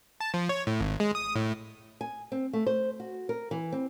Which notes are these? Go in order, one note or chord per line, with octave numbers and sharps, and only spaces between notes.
A5
F3
C#5
A2
G#1
G#3
D#6
A2
G#5
C4
A3
C5
F#4
A#4
E3
C4